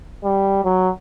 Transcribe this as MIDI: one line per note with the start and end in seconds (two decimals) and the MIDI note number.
0.24 0.60 55
0.64 0.90 54